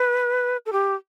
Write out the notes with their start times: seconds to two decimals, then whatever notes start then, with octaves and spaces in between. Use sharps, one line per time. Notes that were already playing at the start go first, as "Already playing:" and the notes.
Already playing: B4
0.66 A4
0.73 G4